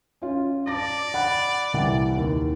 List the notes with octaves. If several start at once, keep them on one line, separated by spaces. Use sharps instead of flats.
C#4 F4
D5 A5 D6 A#6
F#5 B5 F#6
C2 E3 F#5
D#2